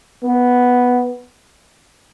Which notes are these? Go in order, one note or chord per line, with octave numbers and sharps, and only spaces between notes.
B3